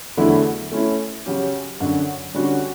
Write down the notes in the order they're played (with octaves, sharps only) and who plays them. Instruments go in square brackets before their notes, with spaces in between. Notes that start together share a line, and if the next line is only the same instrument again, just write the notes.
[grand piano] E2 D3 F#3 A3 E4
A3 C#4 E4
C#3 F#3 C#4 G4
F#2 D3 F#3
D3 G3 C#4 F#4